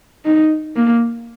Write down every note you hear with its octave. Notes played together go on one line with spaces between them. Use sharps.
D#4
A#3